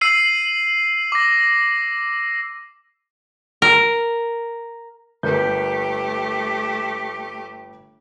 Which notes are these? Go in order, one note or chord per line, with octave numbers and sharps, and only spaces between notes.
E6 C7 D#7 F#7
D6 A#6
A#4
G1 A3 G4 A#4 G6